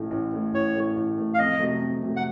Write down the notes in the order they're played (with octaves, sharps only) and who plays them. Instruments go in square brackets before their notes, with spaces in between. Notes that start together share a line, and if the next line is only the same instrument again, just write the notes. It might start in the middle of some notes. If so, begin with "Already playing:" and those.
Already playing: [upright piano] A1 A2 A3
A1
A2 A3
[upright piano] A1 [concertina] C#5
[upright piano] A2 A3
A1
A2 A3
[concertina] F5
[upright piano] F2 [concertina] D#5
[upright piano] C3 F#3 A3
F2
C3 F#3 A3
[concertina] F#5